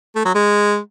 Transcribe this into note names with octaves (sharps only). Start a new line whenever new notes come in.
A3
F#3
G#3